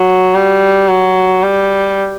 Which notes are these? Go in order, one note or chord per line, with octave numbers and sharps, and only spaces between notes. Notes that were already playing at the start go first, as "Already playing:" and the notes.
Already playing: F#3
G3
F#3
G3